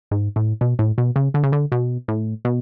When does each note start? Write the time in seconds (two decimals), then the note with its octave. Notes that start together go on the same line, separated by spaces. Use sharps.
0.11 G#2
0.36 A2
0.61 B2
0.79 A2
0.98 B2
1.16 C#3
1.34 D3
1.44 C#3
1.52 D3
1.72 B2
2.08 A2
2.45 B2